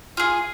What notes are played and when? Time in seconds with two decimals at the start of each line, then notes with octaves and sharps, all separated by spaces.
0.17 F4 G#4